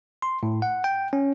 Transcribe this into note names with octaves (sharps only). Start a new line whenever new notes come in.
C6
A2
F#5
G5
C#4